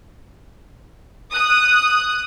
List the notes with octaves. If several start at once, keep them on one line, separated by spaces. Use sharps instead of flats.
D#6 F#6